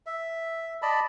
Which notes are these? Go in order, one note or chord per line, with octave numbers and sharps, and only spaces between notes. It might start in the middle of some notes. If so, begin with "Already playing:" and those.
E5
D5 D#5 A5 B5